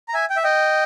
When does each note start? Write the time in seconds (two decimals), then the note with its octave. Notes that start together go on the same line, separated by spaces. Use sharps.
0.08 A#5
0.14 E5 G#5
0.30 G5
0.37 E5
0.44 D#5 G5